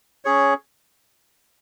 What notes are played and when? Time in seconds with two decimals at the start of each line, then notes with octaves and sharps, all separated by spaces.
0.25 C#4 G#4 C#5